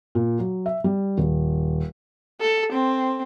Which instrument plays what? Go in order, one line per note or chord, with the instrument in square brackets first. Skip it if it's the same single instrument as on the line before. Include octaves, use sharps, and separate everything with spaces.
[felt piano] A#2
F#3
E5
G3
D#1
[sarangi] A4
C4